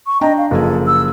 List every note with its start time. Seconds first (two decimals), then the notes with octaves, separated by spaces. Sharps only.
0.06 C#6
0.21 D4 D#5 G5 A#5
0.38 F5
0.51 F#1 F3 G#4 A4
0.86 E6